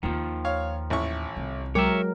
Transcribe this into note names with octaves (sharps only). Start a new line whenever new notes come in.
D#2 D#3 F3 F4
C#5 F5
A1 E4 C#6
C2
F#3 G#3 A#4 C#5 E5 G5 D6